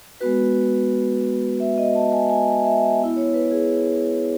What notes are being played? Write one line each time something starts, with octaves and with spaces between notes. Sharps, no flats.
G#3 B3 F#4 B4
E5
D#5
A5
G#5
G#5
E5
B3 E4
C#5
B4
G#4